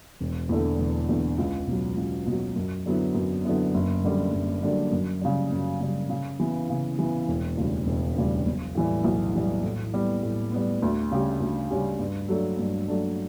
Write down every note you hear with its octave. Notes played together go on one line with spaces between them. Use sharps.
E1
E2 D3 A3
E1
E2 D3 A3
C#2
B2 F#3
C#2
B2 F#3
F#2
D3 F#3 B3 E4
F#2
D3 F#3 B3 E4
F#1
F#2 D3 G3 D4
F#1
F#2 D3 G3 D4
F#2
C#3 G3
F#2
C#3 G3
C#3
E3 B3
C#3
E3 B3
E1
D2 C#3 G3
E1
D2 C#3 G3
B1
A2 E3 G3
B1
A2 E3 G3
A2
G3 B3
A2
G3 B3
D2
C#3 G3 C#4 G4
D2
C#3 G3 C#4 G4
G2
F#3 A3 D4
G2
F#3 A3 D4